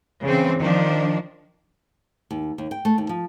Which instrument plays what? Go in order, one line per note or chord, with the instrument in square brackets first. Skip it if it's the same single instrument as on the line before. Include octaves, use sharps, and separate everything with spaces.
[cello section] C#3 E3 C4
D#3 F3 D4
[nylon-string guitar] D#2
D#2
G5
A3
D#2
F3